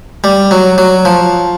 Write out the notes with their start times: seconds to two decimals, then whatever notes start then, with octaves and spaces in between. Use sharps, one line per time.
0.24 G3
0.51 F#3
0.78 F#3
1.05 F3